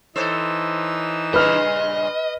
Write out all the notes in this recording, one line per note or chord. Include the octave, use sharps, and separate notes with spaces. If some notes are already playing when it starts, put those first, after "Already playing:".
E3 D#4 A4 C5 C#5 E6
G2 A#2 C#3 B4 D#5 F6